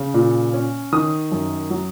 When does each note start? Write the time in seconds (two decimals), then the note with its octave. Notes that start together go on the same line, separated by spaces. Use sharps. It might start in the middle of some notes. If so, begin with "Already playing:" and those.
Already playing: C#3
0.14 A#2
0.54 C#4
0.92 D#3 D#6
1.32 F#2
1.70 F#3